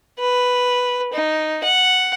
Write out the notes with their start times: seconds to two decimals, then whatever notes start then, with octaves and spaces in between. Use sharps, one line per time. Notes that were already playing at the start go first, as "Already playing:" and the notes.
0.19 B4
1.13 D#4
1.64 F#5